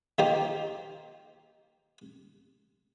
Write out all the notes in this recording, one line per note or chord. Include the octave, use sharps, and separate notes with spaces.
D#3 A#3 F4 G4 C5